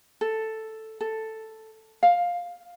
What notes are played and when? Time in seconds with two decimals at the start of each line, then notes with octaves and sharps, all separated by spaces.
0.21 A4
1.01 A4
2.03 F5